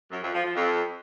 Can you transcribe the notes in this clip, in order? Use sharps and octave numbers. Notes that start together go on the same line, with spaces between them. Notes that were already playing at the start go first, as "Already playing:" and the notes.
F#2
F2
F3
F3
F2